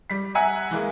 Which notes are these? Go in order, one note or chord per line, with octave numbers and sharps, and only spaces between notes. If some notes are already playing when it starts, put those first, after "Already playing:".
G3 B6
E5 F#5 G#5 A#5
E3 G#3 A#3